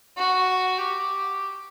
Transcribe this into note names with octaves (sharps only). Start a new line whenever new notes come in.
F#4
G4